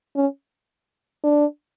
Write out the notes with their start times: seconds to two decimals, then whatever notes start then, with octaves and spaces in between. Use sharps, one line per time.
0.16 C#4
1.24 D4